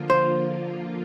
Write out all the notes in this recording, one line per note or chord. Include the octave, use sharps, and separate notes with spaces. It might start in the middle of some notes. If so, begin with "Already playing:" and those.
Already playing: D3 F3 A#3 F4
C5